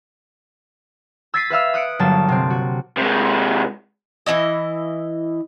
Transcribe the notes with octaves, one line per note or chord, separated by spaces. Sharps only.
E6 G#6 A6 B6 C7 D#7
B4 E5 F5 E6
D#6 F#6 C#7 D7
G1 F#3 A#3 A5
C3 C4
F#4
C3 G#3
E3 F#3 E4 D#5